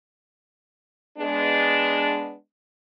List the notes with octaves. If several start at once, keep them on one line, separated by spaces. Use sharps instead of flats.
G#3 B3 D4